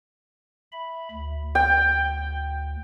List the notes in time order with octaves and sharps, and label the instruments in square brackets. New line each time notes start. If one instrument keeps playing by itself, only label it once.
[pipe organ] E5 B5
D2
[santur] G5